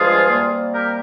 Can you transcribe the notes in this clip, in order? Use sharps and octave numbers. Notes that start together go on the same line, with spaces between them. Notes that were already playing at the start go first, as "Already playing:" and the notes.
Already playing: G2 F3 G#3 F4 G#4
C3 G3 A#3
G4 A#4